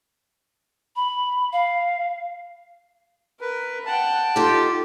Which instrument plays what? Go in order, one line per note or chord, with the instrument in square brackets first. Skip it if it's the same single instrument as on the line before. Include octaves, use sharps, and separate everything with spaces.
[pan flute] B5
F5
[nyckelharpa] A#4 [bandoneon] B4
[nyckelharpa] F#5 G5 [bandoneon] A5
[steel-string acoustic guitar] D#4 A4 [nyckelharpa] F4 [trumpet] G4